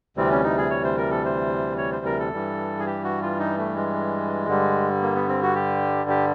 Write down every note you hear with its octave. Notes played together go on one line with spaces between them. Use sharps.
D2 C3 E3 G3 C4
C#4
D#4
G#4
C#5
C5
A#4
A4
C5
C#5
C5
A#4
A4
G2 E3 G3
G#4
G4
F#4
F4
D#4
A3
G#3
G2 D3 G3
A#3
B3
C4
F#4
G4
G4